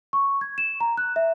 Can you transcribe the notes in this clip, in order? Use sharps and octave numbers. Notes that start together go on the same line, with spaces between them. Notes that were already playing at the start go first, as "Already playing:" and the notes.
C#6
G#6
E7
A#5
F#6
E5